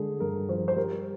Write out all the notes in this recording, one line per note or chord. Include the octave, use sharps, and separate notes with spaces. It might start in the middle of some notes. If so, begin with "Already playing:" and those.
Already playing: D3 G#3 G#4
G2 A#4
F3 C5
C5
G3 A#4